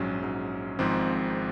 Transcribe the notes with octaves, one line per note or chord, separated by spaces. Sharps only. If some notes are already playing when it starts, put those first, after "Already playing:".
Already playing: A#1 G#2 F#3 C#4
A#1 G#2 F#3
G#1 G#2 F3 G#3 C4